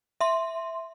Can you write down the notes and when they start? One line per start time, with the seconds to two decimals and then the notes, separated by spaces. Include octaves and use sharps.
0.21 E5 C6